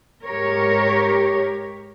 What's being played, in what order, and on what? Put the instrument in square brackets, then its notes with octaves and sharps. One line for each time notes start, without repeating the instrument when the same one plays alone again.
[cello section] G#2 G4 A#4 C#5